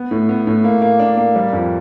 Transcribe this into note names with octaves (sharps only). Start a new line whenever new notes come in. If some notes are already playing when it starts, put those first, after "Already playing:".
Already playing: B3
A2
B3
A2
A#3
A#3
D4
A#3
G3
F2